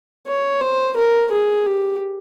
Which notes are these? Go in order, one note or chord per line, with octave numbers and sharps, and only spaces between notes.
C#5
C5
A#4
G#4
G4